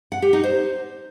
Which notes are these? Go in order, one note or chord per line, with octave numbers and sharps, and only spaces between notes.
F#5
G4
D#4
C5